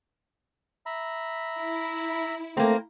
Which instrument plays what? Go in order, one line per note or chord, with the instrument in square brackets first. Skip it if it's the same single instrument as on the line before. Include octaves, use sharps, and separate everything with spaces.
[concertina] E5 A#5 B5
[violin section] E4
[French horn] A3 [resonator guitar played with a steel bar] A#3 C4 [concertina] A#5